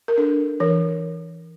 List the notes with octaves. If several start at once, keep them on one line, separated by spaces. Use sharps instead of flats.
A#4
D4 A4
E3 A#4